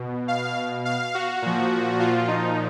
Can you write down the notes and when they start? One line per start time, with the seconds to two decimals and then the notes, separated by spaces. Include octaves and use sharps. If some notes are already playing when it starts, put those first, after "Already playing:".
Already playing: B2
0.28 F5
0.85 F5
1.15 F#4
1.42 A#2 F3
1.99 F4
2.28 D#4